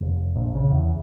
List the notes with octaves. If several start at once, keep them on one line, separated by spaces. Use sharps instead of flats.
F1
A#1
C#3
E2